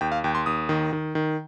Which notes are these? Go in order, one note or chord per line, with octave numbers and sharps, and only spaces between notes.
D#2 G5
F5
D#2 G5
C6
D#2 D#6
D#3
D#3
D#3